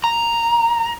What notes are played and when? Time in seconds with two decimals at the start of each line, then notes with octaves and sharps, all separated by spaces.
0.04 A#5